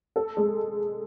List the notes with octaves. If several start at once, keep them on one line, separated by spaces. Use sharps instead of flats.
A4
G#3